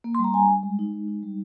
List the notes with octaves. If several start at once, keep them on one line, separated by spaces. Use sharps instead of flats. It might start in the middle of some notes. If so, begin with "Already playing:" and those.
A#3
C6
G3
A#5
D4 G#5
G3
G#3
D#4
G#3
D#4
G3